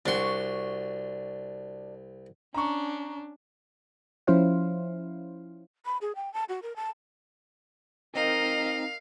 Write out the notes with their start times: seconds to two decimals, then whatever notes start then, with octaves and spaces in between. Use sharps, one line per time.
0.06 C2 D4 F#4 C6 C#6
2.54 C#4 D4 A#5 C#6
4.27 F3 C#4 E4 C5 F5
5.85 B5
6.01 G#4
6.15 G5
6.33 A5
6.49 F#4
6.62 A#4
6.76 A5
8.15 C4 D#4 A#4 D#5 F5